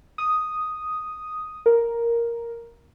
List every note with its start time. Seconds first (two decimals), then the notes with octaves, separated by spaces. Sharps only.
0.18 D#6
1.66 A#4